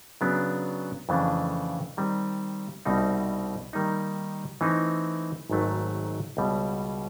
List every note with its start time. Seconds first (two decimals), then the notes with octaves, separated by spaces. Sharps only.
0.21 C#3 F#3 B3 D4
1.09 F2 C#3 E3 A3 D4
1.97 D#3 G3 C4
2.85 C2 B2 G3 C4 D#4
3.73 D#3 G3 A#3 D#4
4.61 E3 A3 C4 D#4
5.50 G#1 G#2 D#3 F#3 A3
6.37 C#2 B2 G3